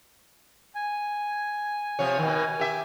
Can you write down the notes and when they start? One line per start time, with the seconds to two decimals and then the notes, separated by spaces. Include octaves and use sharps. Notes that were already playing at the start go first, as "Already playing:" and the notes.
0.75 G#5
1.99 C3 F3 C#5
2.18 B2 D#3
2.59 G4 E5